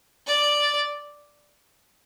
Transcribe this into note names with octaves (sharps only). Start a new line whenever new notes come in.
D5